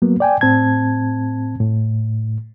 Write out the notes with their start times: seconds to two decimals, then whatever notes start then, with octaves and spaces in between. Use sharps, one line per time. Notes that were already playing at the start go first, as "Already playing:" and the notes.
0.02 F#3 A#3 B3
0.20 D5 G5 G#5
0.41 A2 C4 A5 G#6
1.60 A2